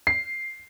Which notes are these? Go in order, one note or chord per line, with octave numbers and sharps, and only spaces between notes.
C7